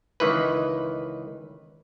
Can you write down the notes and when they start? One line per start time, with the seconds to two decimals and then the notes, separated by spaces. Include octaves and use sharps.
0.20 C#2 D#3 E3 B4